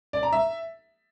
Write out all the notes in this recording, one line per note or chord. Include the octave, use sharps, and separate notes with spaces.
D5
A#5
E5